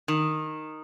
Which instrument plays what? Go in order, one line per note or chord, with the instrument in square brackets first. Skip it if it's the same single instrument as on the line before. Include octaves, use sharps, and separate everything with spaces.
[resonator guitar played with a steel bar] D#3